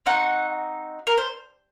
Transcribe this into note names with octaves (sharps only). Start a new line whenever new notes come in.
C4 D#4 F#4 F#5
A#4
C5